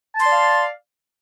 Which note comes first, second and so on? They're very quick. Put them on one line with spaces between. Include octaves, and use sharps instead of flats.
A5 C6 D5 F5